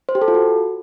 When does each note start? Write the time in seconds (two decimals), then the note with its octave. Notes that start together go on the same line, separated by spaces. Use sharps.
0.09 C5
0.15 G4
0.22 A4
0.28 F4
0.34 F#4